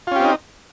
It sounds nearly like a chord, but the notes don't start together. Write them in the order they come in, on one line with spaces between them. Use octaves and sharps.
F4 C#4 G4 C4 D#4